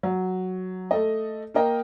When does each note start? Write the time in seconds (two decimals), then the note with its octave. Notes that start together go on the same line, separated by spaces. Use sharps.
0.03 F#3
0.91 A3 A4 D#5
1.54 A#3 A#4 D#5 G5